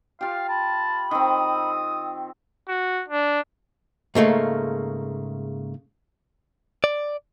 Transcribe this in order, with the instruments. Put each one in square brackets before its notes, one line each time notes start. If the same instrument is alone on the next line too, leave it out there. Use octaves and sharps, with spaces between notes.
[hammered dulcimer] F4 G4 [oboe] F5
[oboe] A5 [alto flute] B5
[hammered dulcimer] D#3 C4 [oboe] D#6
[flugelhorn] F#4
D4
[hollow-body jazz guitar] G#2 C#3 A3 A#3
[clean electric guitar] D5